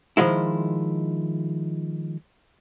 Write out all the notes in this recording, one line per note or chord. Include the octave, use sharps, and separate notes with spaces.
D#3 F3 G#3 E4